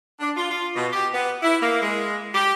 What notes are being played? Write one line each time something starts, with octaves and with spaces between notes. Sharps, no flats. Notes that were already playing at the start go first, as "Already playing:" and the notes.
D4
F4
F4
B2
G4
B3
E4
A#3
G#3
G4